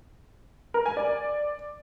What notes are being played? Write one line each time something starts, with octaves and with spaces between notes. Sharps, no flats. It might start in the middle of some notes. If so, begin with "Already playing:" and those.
A#4
G#5
D5